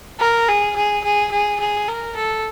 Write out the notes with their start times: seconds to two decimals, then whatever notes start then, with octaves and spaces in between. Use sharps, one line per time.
0.20 A#4
0.48 G#4
0.76 G#4
1.04 G#4
1.32 G#4
1.60 G#4
1.88 A#4
2.16 A4